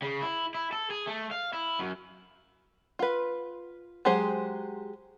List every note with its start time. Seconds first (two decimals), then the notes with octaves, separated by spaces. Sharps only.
0.02 C#3
0.22 E4
0.55 E4
0.72 A4
0.90 G#4
1.07 A3
1.31 F5
1.53 E4
1.79 F#2
2.99 F4 B4
4.05 F#3 G#3 G4 G#4 C5